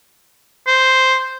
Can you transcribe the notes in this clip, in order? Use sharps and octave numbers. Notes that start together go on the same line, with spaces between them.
C5